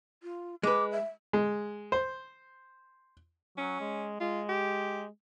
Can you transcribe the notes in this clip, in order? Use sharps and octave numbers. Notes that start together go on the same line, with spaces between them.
F4
G#3 B4 D6
E5
G#3
C5
F#3 C#4
G#3
G#3 F4
G4